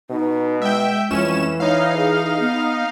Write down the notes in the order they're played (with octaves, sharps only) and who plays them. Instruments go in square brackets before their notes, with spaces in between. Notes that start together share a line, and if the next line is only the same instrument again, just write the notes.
[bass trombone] B2 [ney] D#4
[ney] G#3 [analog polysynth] E5 G5
[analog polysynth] F2 C#4 E7 [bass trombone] E3
[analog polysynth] D#4 F5 [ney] C#5
[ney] G#4
B3